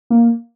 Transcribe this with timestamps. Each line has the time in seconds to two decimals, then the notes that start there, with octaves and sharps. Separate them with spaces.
0.10 A#3